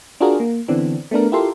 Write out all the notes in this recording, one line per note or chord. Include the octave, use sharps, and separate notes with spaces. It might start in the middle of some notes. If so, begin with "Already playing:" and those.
D4 F4 F#4 G#4 A#4
A#3
D3 E3 B3 C4 D4
A3 B3 D4 A#4
E4 F4 G4 A4 A#4 C6